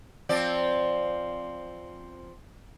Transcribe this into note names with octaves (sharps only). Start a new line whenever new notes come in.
F3 C4 D5